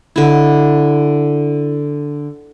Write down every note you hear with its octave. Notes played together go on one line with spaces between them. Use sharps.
D3 E4